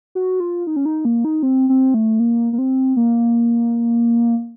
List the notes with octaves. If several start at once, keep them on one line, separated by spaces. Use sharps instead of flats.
F#4
F4
D#4
C#4
D#4
A#3
D#4
C4
C4
A3
A#3
A#3
C4
A#3